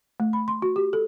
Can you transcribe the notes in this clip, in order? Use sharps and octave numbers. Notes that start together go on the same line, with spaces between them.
A3
B5
C6
F#4
G4
A4